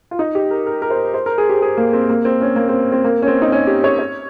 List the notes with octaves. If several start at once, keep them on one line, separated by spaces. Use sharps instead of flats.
F4
D#4
G4
A#4
A#4
A#4
C5
C5
A#4
G#4
G4
G#4
A#3
C4
A#3
C4
C#4
A#3
C4
C4
A#3
C#4
C4
D#4
C#4
G4
C#5
C#5